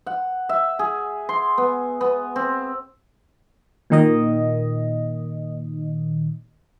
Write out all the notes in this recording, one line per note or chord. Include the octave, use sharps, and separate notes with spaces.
F#5
E5
G#4
C6
B3
B3
C4
A#2 D#3 D#5